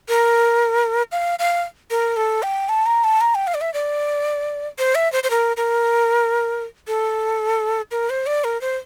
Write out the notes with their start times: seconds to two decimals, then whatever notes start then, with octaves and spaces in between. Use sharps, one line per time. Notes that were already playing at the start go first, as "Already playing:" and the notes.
0.08 A#4
1.12 F5
1.39 F5
1.90 A#4
2.17 A4
2.43 G5
2.69 A5
2.86 A#5
3.04 A5
3.21 A#5
3.35 G5
3.47 F5
3.54 D5
3.61 E5
3.74 D5
4.79 C5
4.95 E5
5.12 C5
5.23 C5
5.30 A#4
5.57 A#4
6.87 A4
7.91 A#4
8.10 C5
8.26 D5
8.44 A#4
8.61 C5